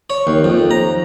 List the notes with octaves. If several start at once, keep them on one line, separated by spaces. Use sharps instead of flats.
C#5
D#2
F2
A#5